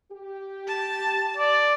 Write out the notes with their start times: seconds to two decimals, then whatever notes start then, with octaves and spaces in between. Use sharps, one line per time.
0.10 G4
0.68 A5
1.37 D5